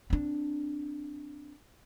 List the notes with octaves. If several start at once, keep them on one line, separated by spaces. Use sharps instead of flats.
C4 D4